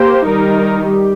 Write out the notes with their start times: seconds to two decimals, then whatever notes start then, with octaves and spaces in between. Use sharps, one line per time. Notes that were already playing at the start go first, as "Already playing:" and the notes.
Already playing: A#3 G4 C5
0.26 D#3 G3 D#4 A#4
0.84 G3 G4